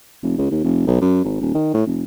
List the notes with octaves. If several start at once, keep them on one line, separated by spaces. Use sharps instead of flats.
F1
C#2
D#2
F1
B1
F#2
G#1
D#1
D#3
A2
F1